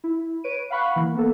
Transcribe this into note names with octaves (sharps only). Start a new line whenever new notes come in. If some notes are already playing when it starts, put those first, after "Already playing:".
E4
B4 C#5 D7 D#7
F5 F#5 B5 C#6 F#6
E3 A#3
A#3 B3 A4